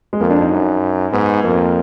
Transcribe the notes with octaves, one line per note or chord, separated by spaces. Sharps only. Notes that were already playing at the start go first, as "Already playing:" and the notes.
G#3
F2 A#3
D4
D#4
F#2
G#2 B3
F2 A#3